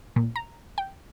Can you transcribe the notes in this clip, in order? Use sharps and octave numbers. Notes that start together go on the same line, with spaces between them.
A#2
A#5
G5